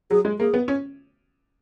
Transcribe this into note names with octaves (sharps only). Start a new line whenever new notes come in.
F#3 G#4
G#3
A#3 G#4
B3
C#4